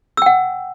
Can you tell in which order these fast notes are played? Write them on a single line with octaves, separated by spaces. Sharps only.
E6 G5 F#5